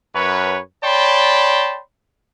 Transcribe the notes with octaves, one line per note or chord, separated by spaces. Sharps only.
F#2 B4 C#5
C#5 D5 G5 A5 B5 C6